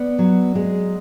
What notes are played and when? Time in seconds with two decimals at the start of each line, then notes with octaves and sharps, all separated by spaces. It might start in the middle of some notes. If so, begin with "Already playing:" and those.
Already playing: B3 D5
0.18 F#3
0.55 G#3